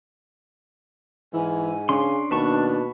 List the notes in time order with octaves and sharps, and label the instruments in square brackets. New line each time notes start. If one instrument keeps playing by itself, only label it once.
[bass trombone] G#2 [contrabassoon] E3 [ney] G#5
[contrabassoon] C#3 [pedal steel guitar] C#4 D4 C6
[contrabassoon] D#2 [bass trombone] B2 [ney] D4 [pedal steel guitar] B4 A5 C#6